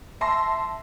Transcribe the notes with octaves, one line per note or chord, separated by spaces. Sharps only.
E5 A5 C6 A#6